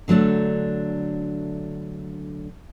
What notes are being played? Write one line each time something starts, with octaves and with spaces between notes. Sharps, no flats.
D3 F#3 A3 D4